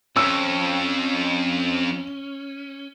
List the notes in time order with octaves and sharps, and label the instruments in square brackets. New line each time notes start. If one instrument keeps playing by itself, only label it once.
[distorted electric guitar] F2 [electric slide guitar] C#4 [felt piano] E6